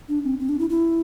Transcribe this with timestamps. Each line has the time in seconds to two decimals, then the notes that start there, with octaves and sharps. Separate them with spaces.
0.09 D4
0.24 C4
0.39 C4
0.49 D4
0.59 E4
0.70 E4